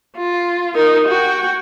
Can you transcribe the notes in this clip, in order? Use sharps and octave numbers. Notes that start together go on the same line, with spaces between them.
F4
D#4 A#4
F#4 G5